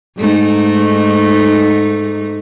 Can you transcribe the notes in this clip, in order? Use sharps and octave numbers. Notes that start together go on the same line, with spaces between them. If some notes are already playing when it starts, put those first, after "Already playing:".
G#2 A3 D#4